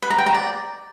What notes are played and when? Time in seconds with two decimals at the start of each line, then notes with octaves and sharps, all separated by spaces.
0.02 B4
0.10 A#5
0.18 G5
0.26 A#5
0.34 D5